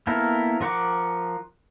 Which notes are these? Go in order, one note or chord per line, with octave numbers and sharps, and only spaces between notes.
A#3 B3 E4 A4 A#4
F3 A#4 F#5 C#6 D6